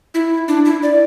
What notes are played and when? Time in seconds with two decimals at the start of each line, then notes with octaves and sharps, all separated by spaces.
0.14 E4
0.48 D4
0.65 E4
0.83 D5